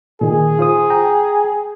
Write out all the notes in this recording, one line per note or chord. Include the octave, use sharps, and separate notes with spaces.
A#2 D#3 G#4
F4 C5 D#6
G5 A#5